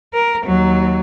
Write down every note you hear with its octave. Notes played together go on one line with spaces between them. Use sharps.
A#4
D#2 F#3